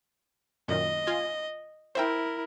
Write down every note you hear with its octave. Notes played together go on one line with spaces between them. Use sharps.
F#2 A#2 D#3 D#5
F4 G#5
E4 A#4 C5 E5 G5